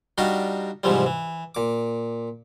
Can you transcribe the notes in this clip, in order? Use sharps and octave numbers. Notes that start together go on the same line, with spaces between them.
G3 D4 D#4 F#4 G4 F5
G#2 C3 E3 F3 G3
E3
A#2 D6